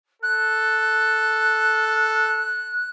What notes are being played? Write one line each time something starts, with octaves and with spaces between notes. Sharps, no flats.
A4 F#6